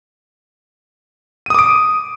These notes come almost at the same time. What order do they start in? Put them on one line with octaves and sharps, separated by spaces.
D#7 D#6 D6 D7